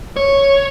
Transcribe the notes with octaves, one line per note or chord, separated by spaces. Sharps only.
C#5